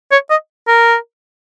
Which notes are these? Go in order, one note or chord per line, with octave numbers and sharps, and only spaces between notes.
C#5
D#5
A#4